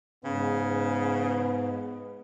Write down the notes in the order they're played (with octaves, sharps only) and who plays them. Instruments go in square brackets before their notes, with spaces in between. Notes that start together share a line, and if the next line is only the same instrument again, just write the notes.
[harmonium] G#2 [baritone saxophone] C#3 [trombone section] B3